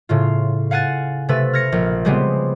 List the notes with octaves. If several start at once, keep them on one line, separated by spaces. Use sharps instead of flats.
A2 C#3 F4
F5 F#5 G#5 F#6 A6
C3 A3 B4 A6
F6 G#6 A#6 C#7
A#1
C#3 G3 G#3 B3 C4